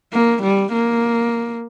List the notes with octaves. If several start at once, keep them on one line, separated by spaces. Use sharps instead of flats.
A#3
G3
A#3